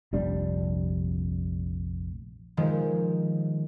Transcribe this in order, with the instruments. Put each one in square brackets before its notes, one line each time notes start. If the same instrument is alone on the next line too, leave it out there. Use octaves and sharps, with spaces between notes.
[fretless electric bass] F1 A#1 G3 D4
[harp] D#3 F3 G#3